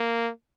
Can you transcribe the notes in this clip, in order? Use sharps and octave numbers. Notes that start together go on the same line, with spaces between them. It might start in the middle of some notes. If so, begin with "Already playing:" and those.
Already playing: A#3